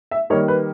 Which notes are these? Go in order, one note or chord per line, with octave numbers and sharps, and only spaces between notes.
E5
D#3 G3 A#3 C#5
B4